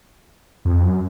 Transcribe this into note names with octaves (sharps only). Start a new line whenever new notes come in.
F2
F#2